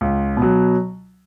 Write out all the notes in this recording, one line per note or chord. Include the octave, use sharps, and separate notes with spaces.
C#2
B2 F#3